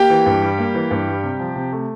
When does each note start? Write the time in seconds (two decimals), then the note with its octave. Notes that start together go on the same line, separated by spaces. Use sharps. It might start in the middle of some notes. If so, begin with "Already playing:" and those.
Already playing: A#3 G4 G5
0.10 E3
0.26 G2
0.41 G3
0.58 A#3
0.74 E3
0.91 G2
1.08 G3
1.24 C3
1.39 F3
1.56 C3
1.72 A3